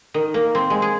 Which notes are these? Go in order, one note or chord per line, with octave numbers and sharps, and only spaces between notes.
D#3
A#3
C4
G#3
G#4